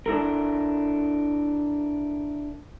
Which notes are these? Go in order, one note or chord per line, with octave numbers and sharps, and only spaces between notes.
D4 E4 A4 A#4